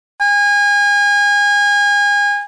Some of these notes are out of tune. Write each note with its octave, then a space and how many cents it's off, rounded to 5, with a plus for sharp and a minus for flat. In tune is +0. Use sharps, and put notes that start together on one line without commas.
G#5 -30